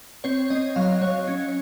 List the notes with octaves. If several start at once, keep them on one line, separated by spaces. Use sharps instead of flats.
C4 C#5
C4 D#5
F#3 F5
F#3 C#5
C#4